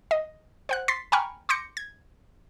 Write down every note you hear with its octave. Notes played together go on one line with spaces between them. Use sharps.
D#5
C5 F#5 F#6
C6 A6 B6 C7
G5 G#5 A#5 B5 C#6 F6
C6 D6 G6 A#6 C#7
G#6